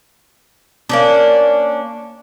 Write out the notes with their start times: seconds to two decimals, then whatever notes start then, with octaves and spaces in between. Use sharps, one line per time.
0.89 A#3 C#4 D4